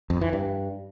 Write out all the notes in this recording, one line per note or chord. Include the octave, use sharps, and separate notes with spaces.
F2
E3
G2